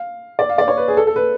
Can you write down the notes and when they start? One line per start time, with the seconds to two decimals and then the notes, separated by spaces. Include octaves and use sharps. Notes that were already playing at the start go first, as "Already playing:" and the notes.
Already playing: F5
0.39 D5
0.49 F5
0.58 D5
0.68 C#5
0.77 B4
0.88 G#4
0.97 A4
1.07 A4
1.16 B4